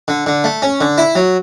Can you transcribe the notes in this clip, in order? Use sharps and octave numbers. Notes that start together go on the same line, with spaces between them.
D3
D3
A3
C#4
D3
E4
F#3